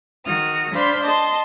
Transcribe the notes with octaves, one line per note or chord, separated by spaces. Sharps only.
D#3 F#4 D#6 F6
D4 C5 F5 B5 C6
D#5 A5 C6